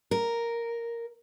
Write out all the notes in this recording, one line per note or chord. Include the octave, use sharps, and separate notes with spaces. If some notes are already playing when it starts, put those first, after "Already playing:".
A#4